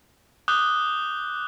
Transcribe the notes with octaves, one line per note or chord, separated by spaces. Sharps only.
D6 D#6 F#6 G6 G7